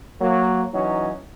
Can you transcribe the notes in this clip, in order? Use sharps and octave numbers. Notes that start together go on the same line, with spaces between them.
F#3 A#3
E3 F#3 C#4 D#4